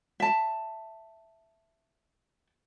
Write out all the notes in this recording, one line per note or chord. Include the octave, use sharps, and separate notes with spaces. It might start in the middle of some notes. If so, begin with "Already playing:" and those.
E5 A5